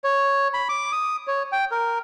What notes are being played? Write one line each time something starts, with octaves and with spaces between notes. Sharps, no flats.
C#5
B5
D6
D#6
C#5
G5
A#4